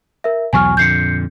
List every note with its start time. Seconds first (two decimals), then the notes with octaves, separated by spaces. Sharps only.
0.24 A#4 E5
0.53 B1 E2 F#3 G#5 C#6 F6
0.77 F2 A#2 D3 G6 C7 C#7